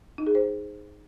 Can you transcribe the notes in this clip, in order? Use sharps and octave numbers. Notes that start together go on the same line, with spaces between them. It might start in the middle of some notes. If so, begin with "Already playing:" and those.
D#4
G#4
C5